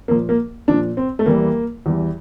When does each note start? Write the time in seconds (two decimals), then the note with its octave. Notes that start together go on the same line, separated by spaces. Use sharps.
0.08 A#2 F3 A#3
0.29 A#3
0.68 A#2 F3 D4
0.97 C4
1.19 A3
1.26 E2 E3 G3 A#3
1.86 E2 E3 G3